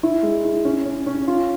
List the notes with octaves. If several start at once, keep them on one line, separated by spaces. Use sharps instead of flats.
E4
G#3
E4
C#4
C#4
C#4
F4